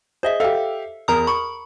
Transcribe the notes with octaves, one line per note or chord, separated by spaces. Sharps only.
G#4 C5 D#5 E5
G4 A4 E5 F5
E2 A#4 A#5 D#6
B5 C#6